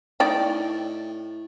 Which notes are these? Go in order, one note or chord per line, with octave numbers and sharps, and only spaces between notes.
A2 D#4 D5 G5